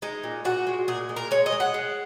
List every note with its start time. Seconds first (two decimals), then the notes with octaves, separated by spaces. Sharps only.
0.02 G#3 D#4
0.24 A#2
0.45 A#2 F#4
0.67 G#3
0.88 A#2 G#4
1.09 G#3
1.16 A#4
1.31 G#3 C#5
1.46 D#5
1.52 G#3
1.60 F#5
1.74 G#3